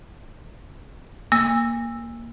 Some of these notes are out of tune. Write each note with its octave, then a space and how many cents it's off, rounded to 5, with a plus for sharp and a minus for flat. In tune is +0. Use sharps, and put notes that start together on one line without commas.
A#3 +0 E6 +0